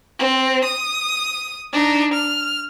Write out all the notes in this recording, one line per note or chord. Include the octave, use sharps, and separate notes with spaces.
C4
D#6
D4 D#4
F6